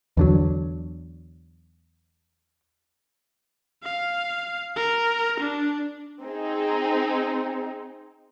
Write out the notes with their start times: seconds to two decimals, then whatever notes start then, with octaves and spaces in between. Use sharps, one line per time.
0.17 E2 D3 F#3
3.83 F5
4.76 A#4
5.40 D4
6.21 C4 D#4 G#4